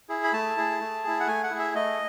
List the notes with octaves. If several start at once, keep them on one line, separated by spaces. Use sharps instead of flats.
E4 G#4
B5
A3 A5
E4 G#4
A3
E4 G#4
F#5
A3 G#5
F#5
E4 G#4
E5
A3 D#5